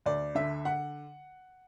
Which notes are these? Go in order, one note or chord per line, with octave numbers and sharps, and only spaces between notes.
D2 D5
D3 E5
F#5